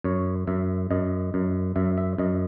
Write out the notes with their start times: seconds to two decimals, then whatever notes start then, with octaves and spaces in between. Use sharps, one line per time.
0.04 F#2 C#5
0.47 F#2 E5
0.91 F#2 D#5
1.34 F#2
1.76 F#2 E5
1.98 E5
2.18 F#2 D#5